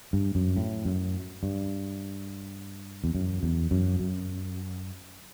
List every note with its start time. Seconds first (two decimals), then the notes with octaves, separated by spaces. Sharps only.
0.13 G2
0.35 F#2
0.56 A2
0.85 F#2
1.43 G2
3.04 E2
3.15 F#2
3.43 E2
3.71 F#2
4.00 F#2